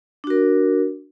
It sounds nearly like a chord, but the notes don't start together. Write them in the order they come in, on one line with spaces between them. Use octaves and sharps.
D4 F#4 A#4